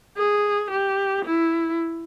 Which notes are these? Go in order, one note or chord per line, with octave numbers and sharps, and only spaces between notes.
G#4
G4
E4